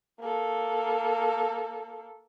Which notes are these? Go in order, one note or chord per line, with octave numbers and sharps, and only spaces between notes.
A#3 A4